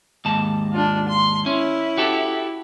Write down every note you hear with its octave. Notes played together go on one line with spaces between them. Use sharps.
D#2 G#2 A5
D4 F4
C6
C#4 E4
F#4 G4 A4